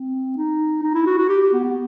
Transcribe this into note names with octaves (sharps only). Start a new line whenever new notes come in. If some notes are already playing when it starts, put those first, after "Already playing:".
Already playing: C4
D#4
D#4
E4
F#4
F#4
G4
G4
B3
B3